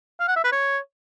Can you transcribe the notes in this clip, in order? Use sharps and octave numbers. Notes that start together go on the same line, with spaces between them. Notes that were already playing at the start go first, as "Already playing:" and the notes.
F5
F#5
E5
B4
C#5